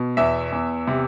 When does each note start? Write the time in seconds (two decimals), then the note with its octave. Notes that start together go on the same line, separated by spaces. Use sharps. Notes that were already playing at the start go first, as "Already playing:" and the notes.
Already playing: B2
0.17 E2 E5
0.52 E2
0.87 C3